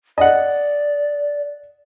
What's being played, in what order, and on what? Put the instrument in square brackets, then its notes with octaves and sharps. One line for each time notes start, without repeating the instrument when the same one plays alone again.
[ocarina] D5 [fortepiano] D#5 F#5